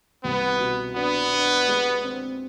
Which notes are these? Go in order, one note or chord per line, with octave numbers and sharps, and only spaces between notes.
C2 B3
B2
B3 D4
D4
G#3
C4